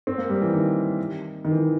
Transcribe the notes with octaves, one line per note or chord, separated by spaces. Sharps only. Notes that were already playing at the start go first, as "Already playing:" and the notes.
C4
A#3
G3
E3
D#3
D#3
E3
D#3